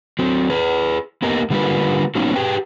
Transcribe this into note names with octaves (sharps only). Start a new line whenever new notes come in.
F#3 C4
G#4 B4
A#3 B3 G4 A#4 D#5
D3 G3 A3 A#3 F4 B4
F#3 A#3 B3 C#4 D#4
G4 G#4 B4 G5